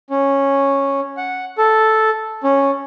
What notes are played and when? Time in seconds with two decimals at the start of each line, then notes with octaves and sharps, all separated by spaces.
0.10 C#4
1.17 F#5
1.58 A4
2.44 C#4